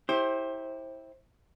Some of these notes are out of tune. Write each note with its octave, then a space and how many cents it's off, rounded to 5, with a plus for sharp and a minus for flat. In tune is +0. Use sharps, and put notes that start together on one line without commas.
E4 -15 G4 +10 C5 +25